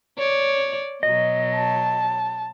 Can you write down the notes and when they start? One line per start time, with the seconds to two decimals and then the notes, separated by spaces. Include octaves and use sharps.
0.18 C#5 D5
1.03 B2 F#3 D#5
1.55 A5